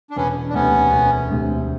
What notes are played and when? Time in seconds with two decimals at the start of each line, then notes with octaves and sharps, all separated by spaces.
0.11 D4
0.16 E1 B3 C#4
0.49 D4
0.54 D2 C3 B3 C#4
0.92 E1
1.29 D2 C3